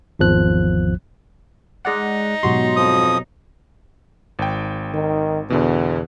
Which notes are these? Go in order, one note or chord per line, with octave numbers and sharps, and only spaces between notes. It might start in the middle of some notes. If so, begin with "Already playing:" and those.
G#1 E2 F3 F#6
G#3 D#4 D5 F#5
G#2 B2 F#3 F#4 G4 C6
F2 F3 D#6
G#1 G5
D#3
E2 B2 D3